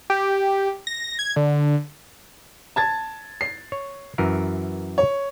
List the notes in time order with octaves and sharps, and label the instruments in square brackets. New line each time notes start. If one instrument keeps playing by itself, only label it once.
[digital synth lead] G4
A#6
G#6
D3
[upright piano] A5 G#6 A6
C7
[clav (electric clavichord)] C#5
F#2 E3 A#4
[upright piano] C#5